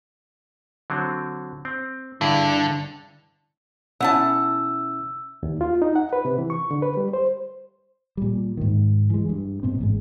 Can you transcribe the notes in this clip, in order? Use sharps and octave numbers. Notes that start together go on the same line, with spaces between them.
D3 F#3 C4
C4
G2 D3 E4 G#4
B2 E3 A3 C#4 E4 F#5 A5 E6
D#2
F4
D#4
F#5
B4
C3
E3
C#6
D3
B4
G3
C5
A#2 G3
G#2 D#3
E3 G#3
G2
G2 B2 A#3 C4
A1 G#2 G#3